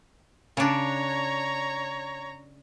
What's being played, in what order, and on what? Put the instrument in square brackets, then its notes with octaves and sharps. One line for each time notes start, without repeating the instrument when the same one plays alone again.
[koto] C#3 D4 [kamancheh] C#5 A#5